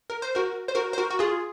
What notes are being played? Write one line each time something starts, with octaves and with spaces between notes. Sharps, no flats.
A#4
C5
F#4 A#4
C5
F#4 A#4
C5
F#4 A#4
F#4
F4 G#4